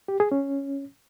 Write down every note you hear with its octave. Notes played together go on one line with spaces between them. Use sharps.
G4
G#4
C#4